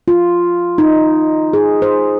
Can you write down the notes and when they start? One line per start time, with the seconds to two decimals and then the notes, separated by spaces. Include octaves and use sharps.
0.08 F4
0.78 D#4
1.53 G#4
1.82 C5